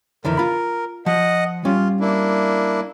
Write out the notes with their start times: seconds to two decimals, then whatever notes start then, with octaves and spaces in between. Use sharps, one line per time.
0.25 F2 D3 E3 A#4
0.37 F4 B5
1.06 F3 D#5 F#5
1.65 G3 C#4 F4
2.01 A#3 D4 E4